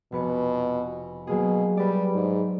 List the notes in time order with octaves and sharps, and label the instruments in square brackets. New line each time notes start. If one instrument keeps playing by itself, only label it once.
[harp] F1 B4 C#7 [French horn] B2
[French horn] B2 [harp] F#3 A#3 G#4
[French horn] G3 [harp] B4 D5
[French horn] G#2